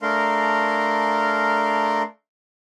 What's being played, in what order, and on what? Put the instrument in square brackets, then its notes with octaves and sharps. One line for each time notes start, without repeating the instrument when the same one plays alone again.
[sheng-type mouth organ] A3 D4 A#4 F5 A#5 C6